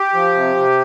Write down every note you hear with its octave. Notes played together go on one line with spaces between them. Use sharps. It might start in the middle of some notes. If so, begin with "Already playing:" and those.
Already playing: G4
F3
C3
C3